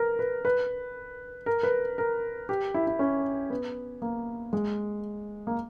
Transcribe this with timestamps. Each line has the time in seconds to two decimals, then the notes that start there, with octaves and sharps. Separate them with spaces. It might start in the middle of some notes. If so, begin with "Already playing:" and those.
Already playing: A#4 B4
0.19 B4
0.45 B4
1.46 A#4
1.63 B4
1.98 A#4
2.49 G4
2.74 E4
2.87 E4
2.99 C#4
3.50 B3
4.02 A#3
4.53 G#3
5.47 A#3